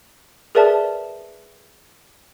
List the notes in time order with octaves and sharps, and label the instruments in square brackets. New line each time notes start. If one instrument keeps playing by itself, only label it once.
[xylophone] G#4 A#4 B4 D5 E5 A5